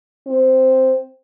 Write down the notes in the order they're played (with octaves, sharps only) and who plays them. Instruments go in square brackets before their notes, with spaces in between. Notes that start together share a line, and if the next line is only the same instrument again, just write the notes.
[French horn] C4